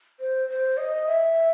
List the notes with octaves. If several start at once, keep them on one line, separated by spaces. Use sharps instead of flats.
C5
C5
D#5
E5